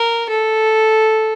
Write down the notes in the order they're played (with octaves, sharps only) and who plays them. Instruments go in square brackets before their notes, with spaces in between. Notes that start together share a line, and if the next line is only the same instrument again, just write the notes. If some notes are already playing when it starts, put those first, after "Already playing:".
Already playing: [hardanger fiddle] A#4
A4